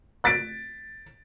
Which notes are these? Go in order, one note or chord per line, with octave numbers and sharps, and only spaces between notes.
F#6 A6 B6 D7